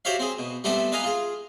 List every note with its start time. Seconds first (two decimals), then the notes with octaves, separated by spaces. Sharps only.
0.05 F#4 G4 C5 C#5 E5 F5
0.19 C4 G#4
0.39 B2
0.64 G3 A3 B3 C4 G4 A4
0.92 B4 D#5 F5 G#5 A#5
1.04 F4 G#4